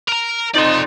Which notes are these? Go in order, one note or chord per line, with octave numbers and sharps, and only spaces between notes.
A#4 A#5
F2 D#4 D5 C6